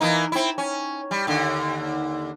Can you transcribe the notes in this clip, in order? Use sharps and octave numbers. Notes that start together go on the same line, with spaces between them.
E3 A#3 D#4
C4 E4
C#4
G3
D#2 D3